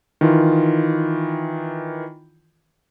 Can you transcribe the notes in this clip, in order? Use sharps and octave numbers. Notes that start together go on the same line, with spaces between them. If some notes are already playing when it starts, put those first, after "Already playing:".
D#3 E3 F4